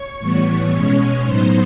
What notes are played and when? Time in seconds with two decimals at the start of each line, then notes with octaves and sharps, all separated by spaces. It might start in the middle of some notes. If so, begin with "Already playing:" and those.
Already playing: C#5 C#6
0.19 A2 E3 G3 B3
0.71 B2 G#3 C#4
1.23 A2 F#3 B3 D#4 C5 C6